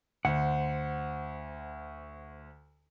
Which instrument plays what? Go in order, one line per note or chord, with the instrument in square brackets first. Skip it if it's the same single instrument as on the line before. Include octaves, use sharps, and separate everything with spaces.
[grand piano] D2 [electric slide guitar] C5 F#5